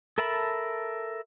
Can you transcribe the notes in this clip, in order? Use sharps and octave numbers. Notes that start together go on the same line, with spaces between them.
A4 A#4 E5 A5 B5